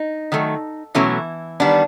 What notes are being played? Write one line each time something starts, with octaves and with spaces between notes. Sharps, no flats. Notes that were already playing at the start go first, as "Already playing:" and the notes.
Already playing: D#4
D#3 F#3 A3
B2 E3 F#3 A3 C#4 E4
D#3 G3 B3 D4